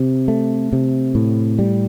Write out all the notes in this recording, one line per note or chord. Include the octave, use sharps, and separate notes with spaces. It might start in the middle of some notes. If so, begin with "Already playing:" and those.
Already playing: C3
A3
C3
A2
G3